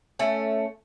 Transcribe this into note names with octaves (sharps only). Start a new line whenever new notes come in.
A3 C#4